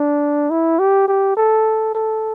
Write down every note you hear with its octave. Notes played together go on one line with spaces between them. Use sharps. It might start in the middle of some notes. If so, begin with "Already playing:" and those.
Already playing: D4
E4
G4
G4
A4
A4